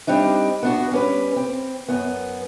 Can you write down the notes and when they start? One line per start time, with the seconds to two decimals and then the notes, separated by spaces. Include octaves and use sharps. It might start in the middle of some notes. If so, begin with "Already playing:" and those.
0.07 G3 C4 D4 D#4
0.63 B3 D4 F#4
0.91 G3 C#4 B4
1.36 C4
1.88 F#2 B3